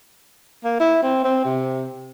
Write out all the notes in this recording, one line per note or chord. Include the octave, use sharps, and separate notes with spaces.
A#3
E4
C4
C4
C3